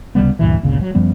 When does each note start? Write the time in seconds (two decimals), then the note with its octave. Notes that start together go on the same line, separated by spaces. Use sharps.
0.15 C#2 C3 G3 B3
0.39 D2 G2 A#2 E3
0.63 G1 C#2 A#2 C#3
0.81 F#3
0.95 F#2 F3 G3 B3